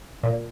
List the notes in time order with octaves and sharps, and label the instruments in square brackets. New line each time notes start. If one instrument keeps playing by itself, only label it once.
[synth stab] A#2